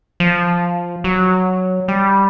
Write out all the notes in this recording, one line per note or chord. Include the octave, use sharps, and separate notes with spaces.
F3
F#3
G3